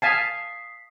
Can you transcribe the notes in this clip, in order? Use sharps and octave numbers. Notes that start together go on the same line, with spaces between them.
F5 G#5 A5 D#6 B6 C7